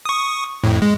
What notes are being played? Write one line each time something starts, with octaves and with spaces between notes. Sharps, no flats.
C#6 D#6
F2 A2
G#3